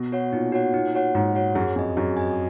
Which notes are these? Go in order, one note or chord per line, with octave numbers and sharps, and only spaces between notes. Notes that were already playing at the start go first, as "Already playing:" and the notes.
Already playing: B2
F#4 C#5 F#5
A#2 D#4
F#4 C#5 F#5
A#2 D#4
F#4 C#5 F#5
G#2 D#4
F#4 C#5 F#5
F#2 G#4
F2 D#5 G#5
F#2 G#4
D#5 G#5